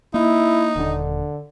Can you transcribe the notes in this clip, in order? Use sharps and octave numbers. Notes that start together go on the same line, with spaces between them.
A#3 D#4 E4
D#1 D3 D4